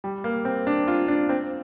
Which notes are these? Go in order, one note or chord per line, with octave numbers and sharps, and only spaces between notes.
G3
A#3
C4
D4
F4
D4
C4